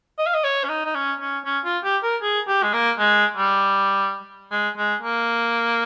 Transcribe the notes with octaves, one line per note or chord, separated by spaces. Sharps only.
D#5
F5
D#5
C#5
C#4
D#4
D#4
C#4
C#4
C#4
F4
G4
A#4
G#4
G4
G#3
A#3
G#3
G3
G#3
G#3
A#3